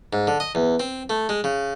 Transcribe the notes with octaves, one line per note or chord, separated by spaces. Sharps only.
G#2
D3
D#5
E2
C4
A3
G#3
C#3